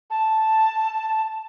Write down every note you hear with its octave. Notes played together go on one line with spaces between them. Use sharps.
A5